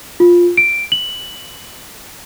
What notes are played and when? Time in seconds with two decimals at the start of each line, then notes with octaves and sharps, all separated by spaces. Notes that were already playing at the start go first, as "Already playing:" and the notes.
0.20 F4
0.57 D7
0.92 F#7